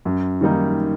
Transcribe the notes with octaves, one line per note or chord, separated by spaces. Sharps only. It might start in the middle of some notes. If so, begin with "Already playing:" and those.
F#2
D#3 G3 A#3 D#4